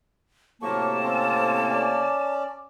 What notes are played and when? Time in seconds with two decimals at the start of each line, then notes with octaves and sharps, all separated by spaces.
0.62 A2 C3 F#3 A#3 G4 A5 C#6
1.03 C4 C#4 A4
1.69 C#4 D5